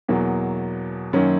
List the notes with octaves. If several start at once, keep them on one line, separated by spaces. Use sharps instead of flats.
E2 B2 F#3 A#3
F#2 D#3 F#3 A#3 C#4